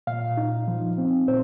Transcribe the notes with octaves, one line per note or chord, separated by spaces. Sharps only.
A#2 F5
D#4
F3
C4
A#2 C5